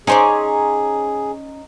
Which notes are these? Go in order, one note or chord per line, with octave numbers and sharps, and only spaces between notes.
C#4 D#4 G#4 C5 D5 G#5 A#5